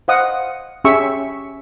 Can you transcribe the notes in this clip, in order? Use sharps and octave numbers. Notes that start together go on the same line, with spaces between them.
C5 D#5 F5 F#5 D#6
C#4 G4 G#4 E5 C#6 E6